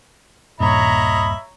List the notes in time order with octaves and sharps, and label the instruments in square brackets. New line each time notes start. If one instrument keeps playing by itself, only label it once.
[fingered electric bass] D#1 G2 A#2 [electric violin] C#5 A#5 [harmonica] D#5 E5 B5